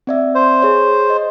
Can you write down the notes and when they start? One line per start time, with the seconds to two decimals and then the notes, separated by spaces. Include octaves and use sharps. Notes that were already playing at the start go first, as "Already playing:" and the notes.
0.07 C4 D5 E5
0.35 C5
0.62 G#4 C#5
1.10 D#5